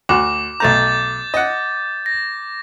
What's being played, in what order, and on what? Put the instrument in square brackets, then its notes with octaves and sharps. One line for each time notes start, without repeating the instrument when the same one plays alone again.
[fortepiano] D2 F#4 [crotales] D6
[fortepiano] B1 A3 A#5 [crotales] G6 A6
[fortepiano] D#5 F#5
[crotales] A#6